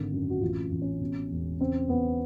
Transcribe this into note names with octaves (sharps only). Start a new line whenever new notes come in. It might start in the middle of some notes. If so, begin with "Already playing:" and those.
Already playing: G#1 D3
F#2
F#4
A1 F4
A1
C#4
B2
E1
C#3 C4
E1 B3